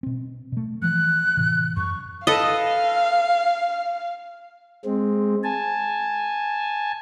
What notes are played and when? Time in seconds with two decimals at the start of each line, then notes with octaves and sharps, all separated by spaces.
0.03 B2 C4
0.52 B2 A3
0.82 E3 F3 A3 F#6
1.37 A2 C3 E3
1.76 F#2 C#6
2.27 A4 B4 D#5 F5
4.85 G#3 C4
5.44 G#5 A5